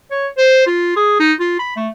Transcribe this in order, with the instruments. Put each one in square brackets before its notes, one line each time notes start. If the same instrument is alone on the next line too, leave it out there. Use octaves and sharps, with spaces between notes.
[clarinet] C#5
C5
F4
G#4
D#4
F4
B5
A3